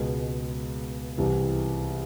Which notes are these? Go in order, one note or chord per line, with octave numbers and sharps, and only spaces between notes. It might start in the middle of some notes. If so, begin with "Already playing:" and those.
Already playing: C#2 B2 G#3 B3
C2 C3 E3